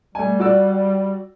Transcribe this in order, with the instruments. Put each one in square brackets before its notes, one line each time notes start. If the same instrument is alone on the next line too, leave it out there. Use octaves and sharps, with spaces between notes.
[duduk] G3 [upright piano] A3 G#5
[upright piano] F#4 D5 E6